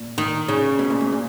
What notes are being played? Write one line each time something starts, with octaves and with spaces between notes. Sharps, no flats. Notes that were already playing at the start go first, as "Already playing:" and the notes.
Already playing: A#2
D#3
C#3
B2
A#2
G#2
A#2